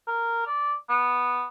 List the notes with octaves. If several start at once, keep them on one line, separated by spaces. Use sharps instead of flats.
A#4
D5
B3